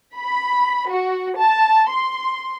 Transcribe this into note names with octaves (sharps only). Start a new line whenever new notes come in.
B5
F#4
A5
C6